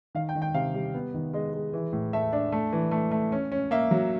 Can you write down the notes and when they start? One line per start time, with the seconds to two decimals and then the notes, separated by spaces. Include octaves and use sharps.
0.15 D#3 F5
0.29 G5
0.35 D#3
0.42 G5
0.54 C3 F5
0.74 G3
0.94 B3
1.14 D#3
1.34 G#3 D#5
1.53 G#3
1.73 E3
1.93 A2
2.13 A3 E5
2.33 D4
2.52 A3
2.73 E3
2.91 A3
3.11 A3
3.32 C#4
3.52 C#4
3.71 A#3 E5
3.91 F#3